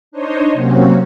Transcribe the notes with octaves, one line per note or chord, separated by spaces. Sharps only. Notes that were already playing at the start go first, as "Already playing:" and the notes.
D4 D#4 C5 C#5 D#5
C3 F#3 A#3 C4 C#4 F#4